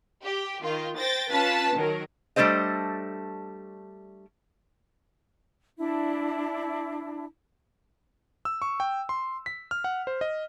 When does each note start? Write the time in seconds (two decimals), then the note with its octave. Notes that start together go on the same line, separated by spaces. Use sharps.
0.23 G4
0.63 D#3 F4
0.97 C5 G5 A6 A#6
1.30 C#4 F4 B4 A5 A6 B6
1.75 D#3 F#3 A#4
2.36 G3 A3 D4 A4 C5 D#5
5.78 D4 E4
8.45 E6
8.62 C#6
8.80 G5
9.09 C6
9.46 B6
9.71 F6
9.84 F#5
10.07 C5
10.21 D#5